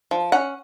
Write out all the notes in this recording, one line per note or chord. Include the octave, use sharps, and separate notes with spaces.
F3
C#4 F#5